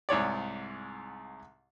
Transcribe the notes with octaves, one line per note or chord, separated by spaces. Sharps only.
C2 G#2 C#5 D5